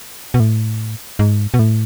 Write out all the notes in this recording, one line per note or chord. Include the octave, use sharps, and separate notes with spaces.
B2
A2
G#2
B2
A2